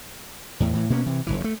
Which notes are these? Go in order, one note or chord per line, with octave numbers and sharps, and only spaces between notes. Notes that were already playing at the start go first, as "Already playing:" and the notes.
E2 A2
A2 E3
B2 A#3 B3 C#4
C3 E3
F#1 C#2 E3
F3 A3